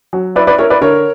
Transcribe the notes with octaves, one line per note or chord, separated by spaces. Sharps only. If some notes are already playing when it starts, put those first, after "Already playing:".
F#3
E4 B4 D5
B4 D5
E4 A#4 C#5
B4 D5
D3 A#4 C#5